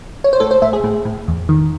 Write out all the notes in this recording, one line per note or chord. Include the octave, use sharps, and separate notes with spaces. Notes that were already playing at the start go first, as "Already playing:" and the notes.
C#5
C5
A2 A4
C5
A2 E5
G#4
A2
A2
E2
D#3